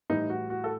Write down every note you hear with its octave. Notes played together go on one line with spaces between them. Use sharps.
A2 E3 G3 D#4
F#4
F#4
A4